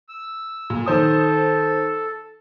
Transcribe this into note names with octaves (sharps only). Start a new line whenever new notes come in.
E6
A#2
D#3 A4 C5 D#6